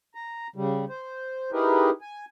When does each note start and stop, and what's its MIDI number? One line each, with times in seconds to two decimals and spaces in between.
0.15 0.47 82
0.56 0.85 49
0.56 0.85 55
0.89 1.51 72
1.52 1.90 63
1.52 1.90 64
1.52 1.90 67
1.52 1.90 68
1.52 1.90 70
1.52 1.90 71
2.01 2.25 80